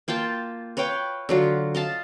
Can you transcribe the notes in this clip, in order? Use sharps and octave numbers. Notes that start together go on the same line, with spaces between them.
A#3 F4 G5 A5
B4 C#5 F5 G5
D3 F#3 F4
D#5 F5 A5